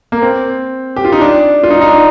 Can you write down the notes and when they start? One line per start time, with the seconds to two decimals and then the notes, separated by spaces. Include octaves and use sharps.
0.12 A#3
0.22 C4
0.96 G4
1.05 F4
1.12 D#4
1.21 D4
1.63 F4
1.70 D#4
1.81 D#4
1.87 D4